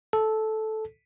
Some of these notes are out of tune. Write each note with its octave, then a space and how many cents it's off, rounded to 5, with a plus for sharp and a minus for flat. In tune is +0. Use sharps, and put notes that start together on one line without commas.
A4 -10